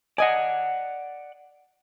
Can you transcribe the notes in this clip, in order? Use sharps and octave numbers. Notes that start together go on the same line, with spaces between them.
D5 D#5 F#5 G#5